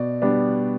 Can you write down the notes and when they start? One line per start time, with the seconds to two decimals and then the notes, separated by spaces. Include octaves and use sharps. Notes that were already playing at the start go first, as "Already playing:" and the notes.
Already playing: B2 D5
0.22 G3 B3 D4